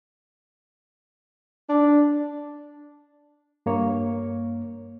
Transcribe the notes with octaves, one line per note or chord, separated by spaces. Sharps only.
D4
G2 A#3 C#5